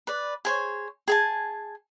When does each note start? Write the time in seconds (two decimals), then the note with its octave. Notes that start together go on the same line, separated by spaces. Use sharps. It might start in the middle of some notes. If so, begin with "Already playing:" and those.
0.07 B4 D5
0.45 G#4 C5 C#5
1.08 G#4 G#5 A5